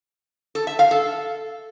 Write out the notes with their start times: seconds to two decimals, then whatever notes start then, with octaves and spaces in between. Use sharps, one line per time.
0.55 A4
0.67 E5
0.79 F5
0.91 A4